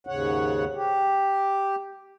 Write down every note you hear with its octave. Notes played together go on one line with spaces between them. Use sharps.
D#2 G#2 C#3 C#5 F#5
G4